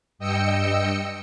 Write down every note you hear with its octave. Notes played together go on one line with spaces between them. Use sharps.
G2 D#5 G5 E6 C#7